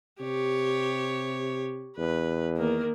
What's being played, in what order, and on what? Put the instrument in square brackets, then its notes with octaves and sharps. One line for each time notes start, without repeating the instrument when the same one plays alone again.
[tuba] C3 [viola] G4 C#5
[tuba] E2 [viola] B4
[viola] D#3 A#3